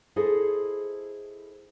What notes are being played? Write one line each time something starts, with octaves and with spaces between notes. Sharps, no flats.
E4 G#4 A4 C5 D#5